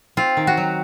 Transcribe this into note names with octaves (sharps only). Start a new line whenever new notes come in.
C4 F4
D#3
F#4
F#3